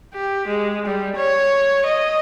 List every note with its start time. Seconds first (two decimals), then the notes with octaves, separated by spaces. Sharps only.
0.14 G4
0.48 G#3
0.86 G3
1.16 C#5
1.86 D#5